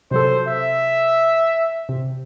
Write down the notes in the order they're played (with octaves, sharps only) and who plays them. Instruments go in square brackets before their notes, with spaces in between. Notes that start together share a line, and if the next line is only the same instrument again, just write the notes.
[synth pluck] C3 F#3 A4 [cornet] C5
[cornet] E5
[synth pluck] C3